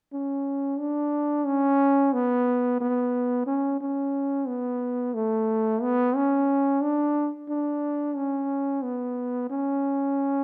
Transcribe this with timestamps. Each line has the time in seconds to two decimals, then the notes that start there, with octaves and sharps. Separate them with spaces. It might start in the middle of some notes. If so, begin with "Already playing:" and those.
0.13 C#4
0.79 D4
1.46 C#4
2.13 B3
2.80 B3
3.47 C#4
3.81 C#4
4.47 B3
5.14 A3
5.82 B3
6.16 C#4
6.83 D4
7.48 D4
8.16 C#4
8.83 B3
9.50 C#4